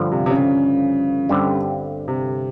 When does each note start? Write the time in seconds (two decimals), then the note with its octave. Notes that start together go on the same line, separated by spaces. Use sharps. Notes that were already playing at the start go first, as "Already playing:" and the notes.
Already playing: G1 G2 D3 F3
0.12 C3
0.26 C3
0.31 C#3
1.29 G1 G2 D3 G3 C4
2.08 C3